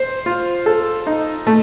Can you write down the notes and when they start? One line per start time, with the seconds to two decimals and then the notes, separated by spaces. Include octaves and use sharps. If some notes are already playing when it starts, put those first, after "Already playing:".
Already playing: C5
0.26 F4
0.66 A4
1.07 D#4
1.47 A3